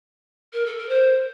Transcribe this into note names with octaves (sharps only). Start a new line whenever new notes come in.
A#4
A4
A#4
C5